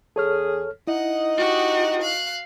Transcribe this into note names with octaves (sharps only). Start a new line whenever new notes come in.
E2 G#4 A4 C#5 F6
D#4 E4 D#5 F#5
F#4 G4 F#5
F5 F#6